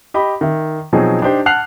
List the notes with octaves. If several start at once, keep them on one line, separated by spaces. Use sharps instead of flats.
G4 D#5 B5
D#3 E5
B2 F3 F#3 C4 D#4 G#4
D4 D#4 G4 C5
F#5 A5 F6 F#6 C7 F7